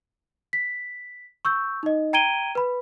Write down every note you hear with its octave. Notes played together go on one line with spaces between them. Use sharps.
B6
C#6 E6 G6
D#4 D#5
G5 A#5 G#6 D7 D#7 G7
B4 B5